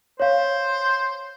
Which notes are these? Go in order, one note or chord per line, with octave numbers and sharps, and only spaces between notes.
C5 C#5 F5